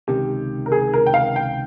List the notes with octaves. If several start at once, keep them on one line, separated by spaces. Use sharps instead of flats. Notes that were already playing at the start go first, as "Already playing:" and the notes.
C#2 C3 D#3 G4
A#4
G#4
A#4
G5
F5
G5